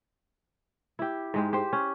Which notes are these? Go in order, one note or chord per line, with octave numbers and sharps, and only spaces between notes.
E4 G4
G#2 G#3 G4
G4 C5
C#4